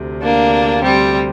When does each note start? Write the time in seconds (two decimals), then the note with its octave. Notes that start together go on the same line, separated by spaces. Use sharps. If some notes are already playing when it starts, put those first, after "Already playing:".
Already playing: D2 C3
0.23 A#3 D4
0.84 G3 C4